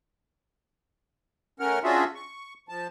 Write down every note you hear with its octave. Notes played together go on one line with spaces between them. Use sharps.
A3 C#4 A#4 F#5 F6
C#4 D4 F4 F#4 G#4 E5
C#6
F3 A5